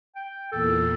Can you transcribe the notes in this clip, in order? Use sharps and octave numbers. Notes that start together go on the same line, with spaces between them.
G5
E2 A#2 A4